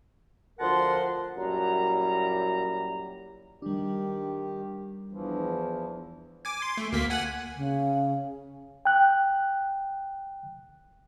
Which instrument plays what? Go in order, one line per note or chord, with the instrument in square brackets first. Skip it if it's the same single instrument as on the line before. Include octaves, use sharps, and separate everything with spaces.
[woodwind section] D2 F3 A#4 F#5 A5 C6
[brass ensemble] F#2 A#2 G3 E4 G4 A#5
[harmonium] D#3 G4 [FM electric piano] G3 D4
[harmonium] E2 E3 F3
[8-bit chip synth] G#5 D6
C6
A3
D2 A#3 B6
F#5 G#5 F#6
[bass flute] C#3
[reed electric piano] G5 F#6